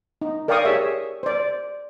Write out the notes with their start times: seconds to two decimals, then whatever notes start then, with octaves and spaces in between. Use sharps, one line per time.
0.21 D#4
0.48 A#4 D5 F5 G5 C#6 D#6
0.65 G4 G#4 C#5 E5
1.23 C5 D5